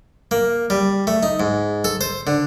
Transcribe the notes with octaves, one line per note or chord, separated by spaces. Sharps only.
A#3
G3
A3
D#4
G#2
A4
C5
D3